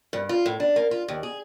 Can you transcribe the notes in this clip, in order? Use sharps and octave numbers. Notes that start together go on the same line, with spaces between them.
G2
F4
A2
D4
A#3
F4
D#2
G#4